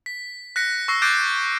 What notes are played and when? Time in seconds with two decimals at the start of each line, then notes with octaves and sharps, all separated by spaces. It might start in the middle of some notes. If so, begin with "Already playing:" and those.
0.06 B6
0.56 F#6 A#6 B6 C#7
0.88 C#6 E6 A#6 C7
1.02 D6 F#6 G6 A6 C7 D7